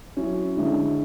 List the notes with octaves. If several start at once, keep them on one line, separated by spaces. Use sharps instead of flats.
F#3 C#4 E4
D3 G#3 C#4 E4